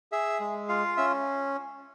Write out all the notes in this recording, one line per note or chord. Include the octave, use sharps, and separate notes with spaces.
G#4 E5
G#3
F4 F5
C#4 E5